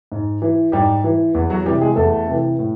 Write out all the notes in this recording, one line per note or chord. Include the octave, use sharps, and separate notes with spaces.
G#2
E3
G#2 G3 G4
E3
E2
F#3 F#4
C3 E3 G3 G4
G#3 G#4
E2 A3 A4
C3 E3
A2